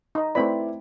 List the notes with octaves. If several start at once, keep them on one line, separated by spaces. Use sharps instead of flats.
D#4 D#5
A3 C4 E4 B4 D5 B5